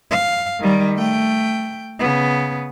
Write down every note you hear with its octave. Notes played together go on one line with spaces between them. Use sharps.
F5
D#3 G3
A3 G5
C#3 B3